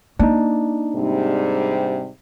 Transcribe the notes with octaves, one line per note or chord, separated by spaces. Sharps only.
A#3 D4 D#4
G#2 C3 G3